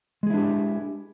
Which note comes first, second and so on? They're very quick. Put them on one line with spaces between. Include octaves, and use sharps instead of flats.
G#3 G#4 E4 D4 G4